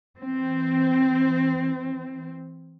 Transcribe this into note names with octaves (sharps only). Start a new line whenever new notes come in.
E3 C4